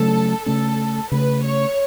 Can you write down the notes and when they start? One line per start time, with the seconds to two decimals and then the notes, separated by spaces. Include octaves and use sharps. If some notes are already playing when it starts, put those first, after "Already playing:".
Already playing: C#3 F#3 A3 A4
0.45 C#3 A3 C#4 A4
1.12 C#3 A3 C#4 B4
1.44 C#5